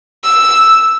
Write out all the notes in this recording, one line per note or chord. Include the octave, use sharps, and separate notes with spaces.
E6